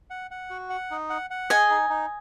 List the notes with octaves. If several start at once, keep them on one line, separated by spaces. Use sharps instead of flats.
F#5
F#5
F#4
F#5
D#4
F#5
F#5
G#4 D#5 G#5
D#4
D#4